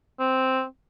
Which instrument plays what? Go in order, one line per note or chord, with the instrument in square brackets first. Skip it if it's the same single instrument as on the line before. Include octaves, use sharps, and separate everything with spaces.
[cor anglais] C4